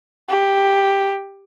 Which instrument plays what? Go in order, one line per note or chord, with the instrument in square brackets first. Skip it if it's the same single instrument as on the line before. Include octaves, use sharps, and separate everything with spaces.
[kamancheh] G4